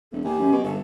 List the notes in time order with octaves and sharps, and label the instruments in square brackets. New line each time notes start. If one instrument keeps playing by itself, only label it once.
[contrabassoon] E1 [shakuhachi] A4
[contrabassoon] D#2 [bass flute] G4 [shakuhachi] G#5
[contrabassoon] F#2
B2
[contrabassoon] G1 [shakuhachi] A4